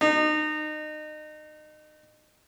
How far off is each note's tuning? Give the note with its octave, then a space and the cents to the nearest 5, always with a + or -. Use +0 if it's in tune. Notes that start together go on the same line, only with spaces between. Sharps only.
D#4 -30